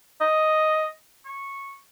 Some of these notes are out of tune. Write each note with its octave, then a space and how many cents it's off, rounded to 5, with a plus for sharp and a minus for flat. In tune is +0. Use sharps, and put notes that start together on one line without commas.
D#5 +5
C#6 -10